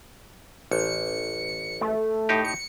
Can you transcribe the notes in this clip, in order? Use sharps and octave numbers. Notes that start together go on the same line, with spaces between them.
A1 C#7
A3
A2 D#4 G4
C#7